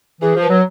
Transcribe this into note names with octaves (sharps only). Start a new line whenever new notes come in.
E3 G#4
F3
B4
F#3